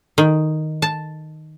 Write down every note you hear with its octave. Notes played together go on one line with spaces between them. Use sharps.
D#3
A5